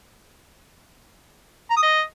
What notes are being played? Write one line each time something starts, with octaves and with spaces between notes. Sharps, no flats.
A#5
D#6
D#5